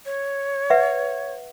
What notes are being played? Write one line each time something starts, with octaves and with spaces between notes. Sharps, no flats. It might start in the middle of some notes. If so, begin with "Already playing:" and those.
C#5
B4 E5 F#5